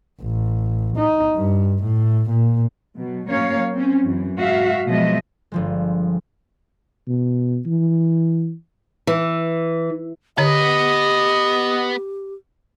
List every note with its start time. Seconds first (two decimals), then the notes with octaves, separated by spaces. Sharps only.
0.22 A1
0.97 D#4
1.36 G2
1.83 A2
2.30 A#2
2.97 B2 F#3
3.29 F#3 A#3 C#4 A#4 C#5 F5
3.73 C4 C#4
4.03 F#2 E3
4.39 G#2 F#4 E5 F5
4.87 B2 F3 F#3 G#3 D#5 E5
5.52 G1 F3 G#3
7.07 B2
7.66 E3
9.07 E3
10.38 D3 B3 G4 B4 C#5 D#5